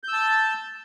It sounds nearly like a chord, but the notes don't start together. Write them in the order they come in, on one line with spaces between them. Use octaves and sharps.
G6 E6 A5